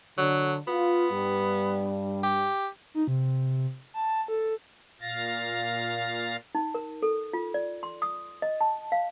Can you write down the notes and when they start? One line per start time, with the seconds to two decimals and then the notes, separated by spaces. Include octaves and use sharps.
0.18 D3 F#3
0.67 B3 F4
1.12 G2 G3
2.23 G4
2.95 D#4
3.08 C3
3.94 A5
4.28 A4
5.01 A#2 F5 A6 A#6
6.55 D#4
6.75 A#4
7.03 A4
7.33 F4
7.54 D5
7.83 C6
8.02 D#6
8.42 D#5
8.61 A5
8.92 F5